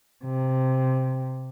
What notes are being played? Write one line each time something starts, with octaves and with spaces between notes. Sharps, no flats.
C3